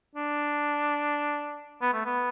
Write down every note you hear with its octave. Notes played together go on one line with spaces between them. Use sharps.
D4
B3
A3
B3